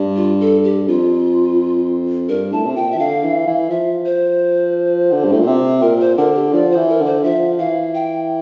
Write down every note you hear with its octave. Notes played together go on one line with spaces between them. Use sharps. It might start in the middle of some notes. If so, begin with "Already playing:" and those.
Already playing: G2
F4
A4
G4
F2 F4
G2 A#4
A2 A5
C3
A#2 G5
E5
E3
D3 F5
E3
E3
F3 E5
C5
D3
G2
A2
A#2
C3
A#2 A#4
C5
D3 A#4
G4
F3 D5
E3 C5
A#4
D3
C5
F3 E5
E3 F5
G5